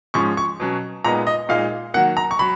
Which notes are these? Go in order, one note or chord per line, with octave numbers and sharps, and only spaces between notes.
G#2 F3 G#3 C#4 C#6
C#6
B2 F#3 C#4
A#2 G#3 B3 D#4 A#5
D#5
A#2 G#3 D#4 F5
D#3 F#3 A#3 F#5
A#5
C#6
F#3 B5